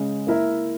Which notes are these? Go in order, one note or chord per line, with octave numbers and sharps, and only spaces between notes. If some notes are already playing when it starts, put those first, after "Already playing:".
Already playing: C#3 G#3 C#4
A#3 E4 A#4 E5